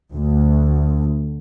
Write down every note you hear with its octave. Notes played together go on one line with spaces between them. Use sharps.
D2